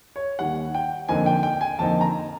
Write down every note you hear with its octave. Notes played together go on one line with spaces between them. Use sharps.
C#5
D#2 D#3 G3 F#5
G5
F2 D3 F3 A#3 D#4 G#5
G5
G5
G#5
F2 D3 F3 A#3 D#4 A5
A#5